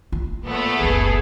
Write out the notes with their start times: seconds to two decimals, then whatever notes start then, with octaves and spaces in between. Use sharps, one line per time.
0.12 F4
0.45 A#2 A3 B3 A4
0.80 F#1 C#2 G#4